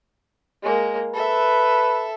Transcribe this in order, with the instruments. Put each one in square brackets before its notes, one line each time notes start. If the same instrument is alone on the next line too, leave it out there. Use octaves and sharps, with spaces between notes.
[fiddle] G#3 A#3
[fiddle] A4 E5 [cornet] B4